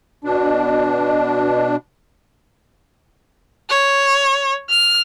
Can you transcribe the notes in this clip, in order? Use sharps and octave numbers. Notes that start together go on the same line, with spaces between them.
B2 D4
C#5
F6